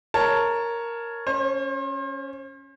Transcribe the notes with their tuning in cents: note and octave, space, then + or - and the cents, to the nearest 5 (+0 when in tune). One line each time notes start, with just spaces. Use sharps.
A#4 +0 C#5 +0 A5 +10
C#4 +0 C5 +40